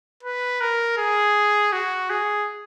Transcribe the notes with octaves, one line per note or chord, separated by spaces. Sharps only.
B4
A#4
G#4
F#4
G#4